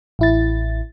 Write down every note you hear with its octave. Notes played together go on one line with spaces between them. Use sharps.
A1 E4 A6